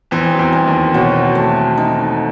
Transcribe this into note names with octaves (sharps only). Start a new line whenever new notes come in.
E2 E3 C4
F#3
E2 E3
G3
D#2 D#3
B2 F#3
A3
D#4